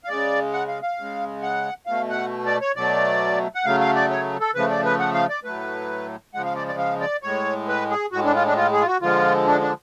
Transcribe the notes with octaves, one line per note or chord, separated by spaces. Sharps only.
F5
C#3 G#3 D5
F#5
F5
F5
C#3 G#3
F#5
B2 A3 F5
F#5
D5
C#5
B2 F#3 A3 D5
F#5
C#3 F#3 A3 F5
F5
D5
C#5
A4
C#3 F3 A3 B4
D5
B4
F#5
F5
D5
A2 F#3 A3 B4
C#3 F3 G#3 F#5
F5
D5
D5
F5
D5
A2 G#3 C#5
B4
G#4
A2 G#3 F#4
D4
F4
D4
F4
G#4
F4
F#4
D3 F3 G#3 F4
D4
D4